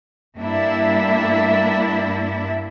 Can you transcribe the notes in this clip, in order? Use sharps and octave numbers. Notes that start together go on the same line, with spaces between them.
G2 A#3 D4 E4 E5